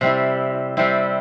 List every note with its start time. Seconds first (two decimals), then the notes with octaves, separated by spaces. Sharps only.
0.01 C3 G3 C4 E4
0.77 C3 G3 C4 E4